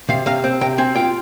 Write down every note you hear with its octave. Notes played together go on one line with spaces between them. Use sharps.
C3 F5
C3 F5
C4
C3 G5
C4 G#5
F4 G5